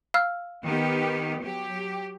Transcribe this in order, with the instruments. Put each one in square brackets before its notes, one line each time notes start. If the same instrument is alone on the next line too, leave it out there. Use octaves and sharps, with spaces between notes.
[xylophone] F5 E6 F6
[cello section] D#3 B3 G4
F#3 G4